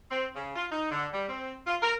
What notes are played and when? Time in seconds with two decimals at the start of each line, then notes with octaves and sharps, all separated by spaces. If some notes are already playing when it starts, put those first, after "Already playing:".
0.11 C4
0.36 C#3
0.56 F4
0.72 D#4
0.91 D3
1.13 G3
1.29 C4
1.67 F4
1.83 A#4